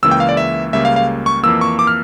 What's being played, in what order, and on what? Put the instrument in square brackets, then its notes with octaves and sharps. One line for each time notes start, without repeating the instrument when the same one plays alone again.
[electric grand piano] C#2 C#3 E3 A#3 E6
G5
F5
D5
E5
C#2 C#3 G3 A#3 E5
F5
F5
C#6
F2 E3 A#3 E6
C#6
D6
F6